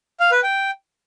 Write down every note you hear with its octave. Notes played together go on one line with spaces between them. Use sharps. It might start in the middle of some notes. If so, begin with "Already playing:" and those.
F5
B4
G5